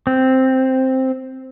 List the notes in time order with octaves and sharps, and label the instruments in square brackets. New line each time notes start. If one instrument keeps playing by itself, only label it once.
[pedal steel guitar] C4